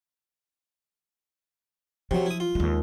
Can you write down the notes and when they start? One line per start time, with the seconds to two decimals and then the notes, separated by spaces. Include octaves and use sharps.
2.11 C3 F3 F#3
2.26 E4 D#6
2.40 F4
2.55 D#2 G#3